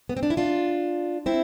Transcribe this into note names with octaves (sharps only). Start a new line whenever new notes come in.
B3
C4
D4
E4
D4 F4
C4 E4